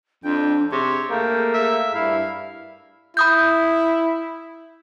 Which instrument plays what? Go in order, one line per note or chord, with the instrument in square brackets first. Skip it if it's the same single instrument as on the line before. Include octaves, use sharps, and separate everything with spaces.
[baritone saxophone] F2 [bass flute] D4 [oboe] G5
[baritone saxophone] C3 [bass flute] G#4 [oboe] C#5
[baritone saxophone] A3 [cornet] A#3 [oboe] G5
[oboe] E5
[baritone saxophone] G2 [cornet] E4 [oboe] F5
[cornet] E4 [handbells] B5 D#6 G6